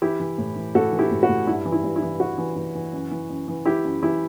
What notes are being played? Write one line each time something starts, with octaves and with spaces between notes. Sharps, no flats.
E3 E4 G4
E3
A2
E3
A2 F#4 A4
E3
E4 G4
A2
F#4
A2
G2 E4
E3
E4
G2
E4
E3
E3 F#4
E3
E3
E3
F#2
E3
F#2
E3
E3 E4 G4
F#2
E3 E4 G4